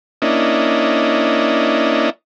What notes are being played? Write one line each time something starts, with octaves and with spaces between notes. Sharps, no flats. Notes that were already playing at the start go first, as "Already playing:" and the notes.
A#3 C#4 D4 E4 D#5